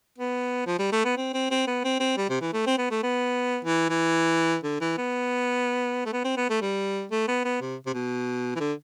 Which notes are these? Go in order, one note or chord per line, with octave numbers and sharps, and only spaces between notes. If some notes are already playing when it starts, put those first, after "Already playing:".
B3
F3
G3
A3
B3
C4
C4
C4
B3
C4
C4
G3
C3
E3
A3
C4
B3
A3
B3
E3
E3
D3
E3
B3
A3
B3
C4
B3
A3
G3
A3
B3
B3
C3
C3
B2
E3
D3